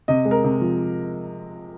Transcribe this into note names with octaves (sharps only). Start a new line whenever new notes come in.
C3 D#5
G#3
A#4
C3
F3